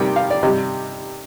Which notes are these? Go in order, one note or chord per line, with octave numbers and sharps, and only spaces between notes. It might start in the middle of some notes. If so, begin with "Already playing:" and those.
Already playing: C3 D#3 G3 G5
F5
D5
C3 G3 D#5